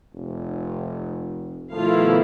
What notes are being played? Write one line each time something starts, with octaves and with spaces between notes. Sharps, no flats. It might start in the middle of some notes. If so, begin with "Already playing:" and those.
F1
B2 D#3 F3 A3 E4 F4 F5